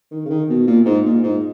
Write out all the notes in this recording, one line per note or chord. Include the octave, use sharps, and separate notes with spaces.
D#3
C#3
D#3
B2
A#2
G#2
A#2
G#2